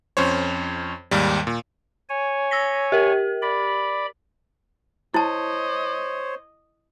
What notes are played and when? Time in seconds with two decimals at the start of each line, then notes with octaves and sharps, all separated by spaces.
0.17 F2 C#4 C5 C#5
1.11 D#2 G#2 G3
1.47 A#2
2.09 C#5 G#5
2.51 E6 A#6 B6
2.92 G4 A#4
3.42 D5 B5
5.14 E4 C5 C#5 D#5 A5